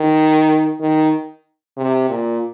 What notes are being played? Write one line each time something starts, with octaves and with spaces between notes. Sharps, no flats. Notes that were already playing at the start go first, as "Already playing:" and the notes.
Already playing: D#3
D#3
C3
A#2